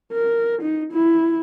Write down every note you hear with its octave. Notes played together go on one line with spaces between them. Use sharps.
A#4
D#4
E4